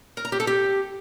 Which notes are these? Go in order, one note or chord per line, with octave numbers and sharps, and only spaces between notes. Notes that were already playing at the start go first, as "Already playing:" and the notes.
A#4
A#5
G4
A4
G4